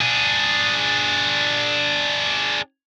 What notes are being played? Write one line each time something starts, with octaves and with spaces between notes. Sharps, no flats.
D4 G#4